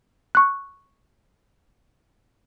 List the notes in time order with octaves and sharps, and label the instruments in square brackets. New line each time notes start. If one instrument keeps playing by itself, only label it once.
[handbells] C#6 F#6